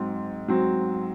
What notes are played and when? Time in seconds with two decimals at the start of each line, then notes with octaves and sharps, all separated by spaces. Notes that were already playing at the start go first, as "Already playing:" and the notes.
Already playing: G#2 F#3 C4
0.48 G#2 F#3 C4